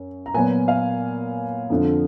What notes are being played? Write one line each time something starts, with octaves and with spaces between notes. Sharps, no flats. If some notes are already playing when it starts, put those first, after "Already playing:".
Already playing: F#2
A#5
A#2 F#3 B3 G#5
F5
F2 D3 F3